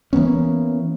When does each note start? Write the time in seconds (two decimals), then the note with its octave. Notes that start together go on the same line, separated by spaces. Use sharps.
0.13 E3 A#3 B3 C#4